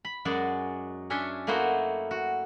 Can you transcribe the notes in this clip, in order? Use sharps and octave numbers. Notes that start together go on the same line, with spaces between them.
B5
F#2 G#3 F#4 G#4 D5
C#4 D4 C#5 E5 G#5 C6
A3 A#3 E4 F#4 C5 D#5
F#4